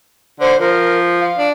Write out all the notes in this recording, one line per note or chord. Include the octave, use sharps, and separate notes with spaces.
D3 C5
F3 A#4
F5
D4